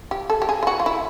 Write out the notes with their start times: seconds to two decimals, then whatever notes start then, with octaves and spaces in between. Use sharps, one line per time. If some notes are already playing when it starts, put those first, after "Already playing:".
0.11 G4
0.30 A4
0.42 G4
0.49 G#4
0.63 F4
0.67 F#4
0.80 F4
0.86 E4